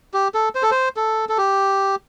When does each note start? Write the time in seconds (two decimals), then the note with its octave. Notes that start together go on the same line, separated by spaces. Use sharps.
0.14 G4
0.34 A4
0.55 C5
0.63 A4
0.71 C5
0.96 A4
1.29 A4
1.38 G4